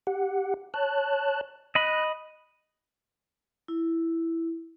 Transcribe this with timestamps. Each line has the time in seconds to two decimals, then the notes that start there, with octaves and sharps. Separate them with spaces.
0.07 G4 F#5
0.74 C#5 A5 F#6
1.75 D#5 B5 F#6
3.68 E4